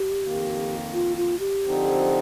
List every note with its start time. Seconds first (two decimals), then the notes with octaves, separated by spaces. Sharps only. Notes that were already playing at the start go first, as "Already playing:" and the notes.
Already playing: G4
0.23 F2 D#3 A#3
0.93 F4
1.17 F4
1.39 G4
1.63 D3 F3 C4 D#4